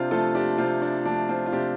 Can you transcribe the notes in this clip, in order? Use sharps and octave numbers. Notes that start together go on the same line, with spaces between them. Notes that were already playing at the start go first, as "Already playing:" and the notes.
Already playing: C3 C4 D4 F4
F3 A3 F4 A4
D4 G4
C3 C4 F4
D4
F3 A3 D4
C4 F4
F4
C3 D4 G4